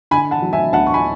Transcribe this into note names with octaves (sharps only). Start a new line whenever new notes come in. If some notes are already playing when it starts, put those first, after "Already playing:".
D3 G#5 B5
F#5 A5
F#3
E5 G#5
D2 F#5 A5
C#6
G#5 B5